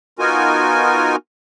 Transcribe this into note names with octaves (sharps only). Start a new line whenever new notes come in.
B3 D#4 F4 F#4 A#4 G#5